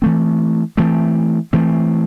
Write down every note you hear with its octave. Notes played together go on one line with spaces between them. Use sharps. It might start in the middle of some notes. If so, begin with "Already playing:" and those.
E3 A3 C4
E3 A3 C4
E3 A3 C4